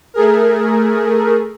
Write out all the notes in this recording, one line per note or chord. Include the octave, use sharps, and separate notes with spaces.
A3 G#4 A#4